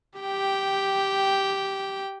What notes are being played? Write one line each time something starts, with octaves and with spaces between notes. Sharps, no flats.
G4 G5